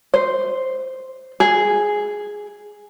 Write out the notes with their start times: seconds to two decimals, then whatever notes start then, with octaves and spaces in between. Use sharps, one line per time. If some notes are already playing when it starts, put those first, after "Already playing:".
0.14 C5
1.40 G#4